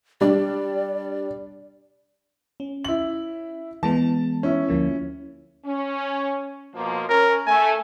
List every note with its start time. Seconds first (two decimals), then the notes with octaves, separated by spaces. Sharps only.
0.21 G3 D4 D5
2.60 C#4
2.85 E4 F#7
3.83 E3 G#3 B3 A5
4.43 C#4 E4
4.68 D2 F3 A#3
5.65 C#4
6.75 B2 F3 A#3
7.09 C#4 A#4
7.47 A3 G#5